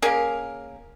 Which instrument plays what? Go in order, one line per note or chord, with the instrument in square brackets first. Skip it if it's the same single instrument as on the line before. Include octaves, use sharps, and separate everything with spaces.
[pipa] A#3 C#4 G#4 A#4